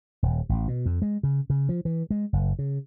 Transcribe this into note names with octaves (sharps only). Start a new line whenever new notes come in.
D#1
A1
B2
F2
G#3
C#3
C#3
F3
E3
G#3
F#1
C#3